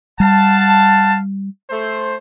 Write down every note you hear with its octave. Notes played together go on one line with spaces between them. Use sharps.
G3 F5 F#5 A5
A3 C5